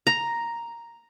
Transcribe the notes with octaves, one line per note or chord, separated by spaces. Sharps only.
A#5